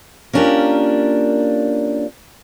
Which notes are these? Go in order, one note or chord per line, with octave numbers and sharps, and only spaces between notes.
A#3 C#4 D4 F4 G4 A#4